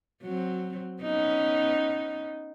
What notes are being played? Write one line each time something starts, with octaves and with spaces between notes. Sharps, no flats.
F#3 C4
B3 C#4 D#4